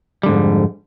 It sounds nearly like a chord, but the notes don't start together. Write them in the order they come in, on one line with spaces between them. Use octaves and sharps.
G3 D3 G#2 F2